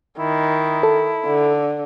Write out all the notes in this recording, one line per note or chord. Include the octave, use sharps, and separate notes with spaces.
D#3 E4
A4
D3